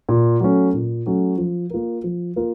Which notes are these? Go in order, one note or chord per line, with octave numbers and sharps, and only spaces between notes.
A#2
F#3 A3 C#4
A#2
F#3 A3 C#4
F3
A#3 F4 A#4
F3
A#3 F4 A#4